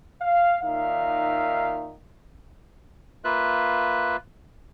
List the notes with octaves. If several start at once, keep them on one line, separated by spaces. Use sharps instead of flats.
F5
A#2 D#3 D#4 E5 F5
A#3 F4 B4 E5 F#6